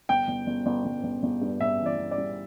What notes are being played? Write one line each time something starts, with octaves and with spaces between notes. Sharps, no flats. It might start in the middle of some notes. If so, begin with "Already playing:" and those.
G1 G5
G1
G1
G1
G1
G1
G1
G2
G1 E5
E3
D5
G1
D5
G3